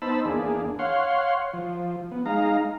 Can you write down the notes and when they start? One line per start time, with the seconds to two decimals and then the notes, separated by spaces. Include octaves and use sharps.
0.02 B3 D#4 C5 A5 B5 E6
0.25 E2 A#3 D4 G#4
0.79 C#5 F5 F#5 C6
1.53 F3
2.11 B3
2.26 G#3 D#4 F5 A#5